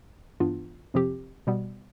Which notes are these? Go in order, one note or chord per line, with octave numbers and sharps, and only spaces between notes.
G2 E3 B3 D4 F4
F2 C3 F3 C4 G4
B2 G3 B3